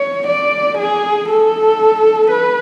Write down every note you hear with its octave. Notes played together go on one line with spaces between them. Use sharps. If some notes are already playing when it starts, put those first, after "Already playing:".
Already playing: C#5
D5
G#4
A4
B4